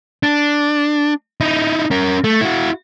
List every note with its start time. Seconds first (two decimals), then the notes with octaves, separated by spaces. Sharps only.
0.23 D4
1.41 D#4 E4
1.91 C#4 A#4
2.24 A3
2.41 E4 F#4